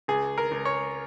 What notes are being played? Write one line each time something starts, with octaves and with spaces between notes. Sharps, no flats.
C#2 G#4
A#4
C#2
C#5